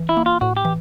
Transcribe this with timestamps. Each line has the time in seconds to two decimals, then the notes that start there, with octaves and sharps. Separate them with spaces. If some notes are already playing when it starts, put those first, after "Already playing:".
Already playing: E3
0.09 E4
0.17 A#3
0.26 F4
0.41 A2 F#4
0.57 G4
0.65 E3